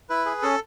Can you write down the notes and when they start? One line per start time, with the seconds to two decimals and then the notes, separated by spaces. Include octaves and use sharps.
0.09 E4 B4
0.26 G#4
0.42 C#4 A4